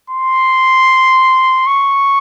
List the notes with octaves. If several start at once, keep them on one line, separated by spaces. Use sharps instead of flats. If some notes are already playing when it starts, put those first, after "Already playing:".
C6
C#6